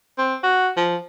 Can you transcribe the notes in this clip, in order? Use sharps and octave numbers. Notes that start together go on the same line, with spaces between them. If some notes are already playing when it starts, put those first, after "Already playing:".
C4
F#4
F3